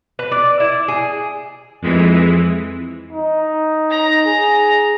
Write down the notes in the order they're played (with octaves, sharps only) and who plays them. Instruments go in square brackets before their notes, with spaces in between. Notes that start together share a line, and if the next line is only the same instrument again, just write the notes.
[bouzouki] B4
D5
E4
G#4
[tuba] F2 [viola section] E3 G#3
[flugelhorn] D#4
[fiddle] A#5
[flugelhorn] G#4